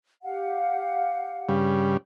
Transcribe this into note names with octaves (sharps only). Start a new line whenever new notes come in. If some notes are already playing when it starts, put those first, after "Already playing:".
G4 F5 F#5
G2 C#3 G3